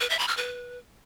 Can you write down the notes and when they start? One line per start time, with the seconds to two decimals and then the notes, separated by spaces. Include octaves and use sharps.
0.01 B4
0.10 E5
0.19 B5
0.28 F6
0.37 B4